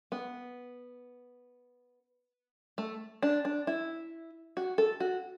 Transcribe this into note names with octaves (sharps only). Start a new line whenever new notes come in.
B3
A3
D4
D4
E4
F#4
A4
F#4